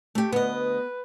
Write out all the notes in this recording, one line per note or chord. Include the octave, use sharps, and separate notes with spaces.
A3 G4
D2 B3 B4 D#5